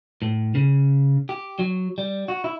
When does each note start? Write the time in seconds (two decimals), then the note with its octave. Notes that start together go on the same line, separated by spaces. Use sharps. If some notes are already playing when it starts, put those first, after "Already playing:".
0.22 A2
0.55 C#3
1.29 G4
1.59 F#3
1.98 G3
2.28 F#4
2.44 E4